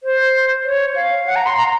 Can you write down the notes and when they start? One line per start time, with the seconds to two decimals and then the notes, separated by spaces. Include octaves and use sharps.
0.03 C5
0.64 C#5
0.95 F5
1.26 F#5
1.36 A#5
1.46 C6
1.57 A#5